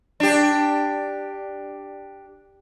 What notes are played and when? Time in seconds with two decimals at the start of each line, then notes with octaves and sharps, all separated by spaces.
0.20 D4 G4